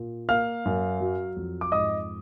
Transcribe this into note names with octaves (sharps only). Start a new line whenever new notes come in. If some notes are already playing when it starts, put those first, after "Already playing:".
Already playing: A#2
A#3 F5 F6
F#2
F#3
F2
D6
G#2 D#5 D#6